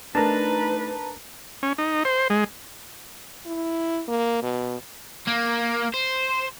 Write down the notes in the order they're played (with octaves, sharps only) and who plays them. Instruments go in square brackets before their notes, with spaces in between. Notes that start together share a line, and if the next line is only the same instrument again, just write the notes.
[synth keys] A3 D#4 [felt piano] D4 A#4 [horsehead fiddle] B4 [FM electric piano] A5 A#5
[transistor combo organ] C#4
D#4
C5
G#3
[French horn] E4
A#3
B2
[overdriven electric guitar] A#3
C5